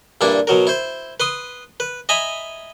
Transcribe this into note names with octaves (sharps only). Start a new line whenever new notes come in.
G2 A#2 D4 E4
B2 F#3 A#4
E4 C5
B4 C6 D#6
B4
D#5 E5 G#5 A#5 B5